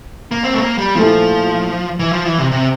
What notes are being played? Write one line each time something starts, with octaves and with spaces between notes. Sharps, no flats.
A#3
C4
A3
A#3
G3
A#2 F3 A3 E4 A4
E3
F3
E3
C3
C3